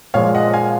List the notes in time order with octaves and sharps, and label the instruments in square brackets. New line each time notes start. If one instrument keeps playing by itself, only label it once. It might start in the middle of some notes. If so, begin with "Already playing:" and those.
[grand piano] A#2 F3 G#3 [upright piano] C#5 F5
[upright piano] D#5 F#5
F5 G#5